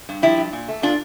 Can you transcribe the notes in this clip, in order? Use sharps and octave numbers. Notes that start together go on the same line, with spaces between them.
G2
F3 E4 G4
G2
A#2
A3
A#2 D4 F4